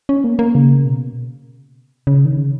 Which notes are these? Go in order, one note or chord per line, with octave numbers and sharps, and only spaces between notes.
C#4
A#3
A#3
C#3
B2
C#3
D#3
C#3